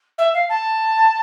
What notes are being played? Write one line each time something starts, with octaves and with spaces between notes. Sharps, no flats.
E5
F5
A5